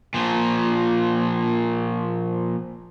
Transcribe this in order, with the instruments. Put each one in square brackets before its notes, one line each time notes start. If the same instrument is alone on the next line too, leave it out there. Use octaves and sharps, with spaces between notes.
[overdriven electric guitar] A#2 F3